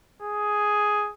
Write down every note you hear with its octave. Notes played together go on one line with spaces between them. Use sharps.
G#4